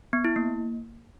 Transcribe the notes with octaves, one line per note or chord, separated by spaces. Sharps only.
B3
E4
A#3